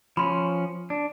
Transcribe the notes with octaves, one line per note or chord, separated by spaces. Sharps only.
F3 C#4 B5 C6
D4